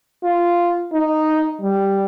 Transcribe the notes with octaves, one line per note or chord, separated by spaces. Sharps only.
F4
D#4
G3